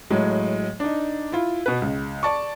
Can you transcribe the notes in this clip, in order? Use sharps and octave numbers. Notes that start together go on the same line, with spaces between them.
A2 F#3 G#3
D4 D#4
E4 F4
B2 B4
C#2
D5 A5 C#6